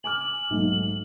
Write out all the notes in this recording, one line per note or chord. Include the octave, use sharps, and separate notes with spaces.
G#5 D6 F6 F#7
B1 G#2 A3